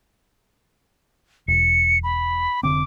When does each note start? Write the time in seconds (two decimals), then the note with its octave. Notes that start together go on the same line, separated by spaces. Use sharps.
1.48 E1 C#7
2.03 B5
2.63 F1 D3 C4 D6